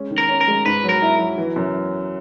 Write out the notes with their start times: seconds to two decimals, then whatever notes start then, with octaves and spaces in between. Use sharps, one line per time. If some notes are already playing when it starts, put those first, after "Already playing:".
Already playing: G#3 C#4
0.11 D#3
0.18 A#4
0.29 C#4
0.41 A#4
0.48 G#3
0.65 G#2 B4
0.84 F#3
0.89 A#4
1.02 E4
1.19 F#3
1.38 E3
1.56 F#2